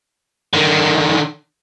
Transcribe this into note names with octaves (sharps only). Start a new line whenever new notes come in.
D3 D#3